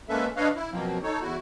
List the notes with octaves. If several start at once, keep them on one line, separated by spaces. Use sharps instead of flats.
G#3 A#3 C#4 A4 B4 E5
D4 B4 C#5 D#5 F5
E4
B2 F3 F#3 A#3 C4
D#4 A4 C#5
E2 E4 F#4